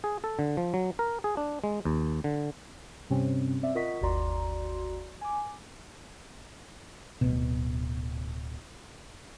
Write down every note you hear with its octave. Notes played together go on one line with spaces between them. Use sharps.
G#4
A4
D3
F3
F#3
A#4
G#4
D4
G#3
D#2
D3
G2 C3 G3 C4 C#4
C4 D5 E5
F4 A#4 D#5 F#5 C#6 B6
G1 D#2 F#4 D5 A#5 C6
G#5 D6
D1 B2